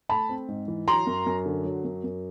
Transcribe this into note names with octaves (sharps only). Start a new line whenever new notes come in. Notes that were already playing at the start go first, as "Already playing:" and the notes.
A3 A5 B5
C4
G#2
E3
F#3 A#5 C6
F#2
F#2
D3
F#3
F#2
F#2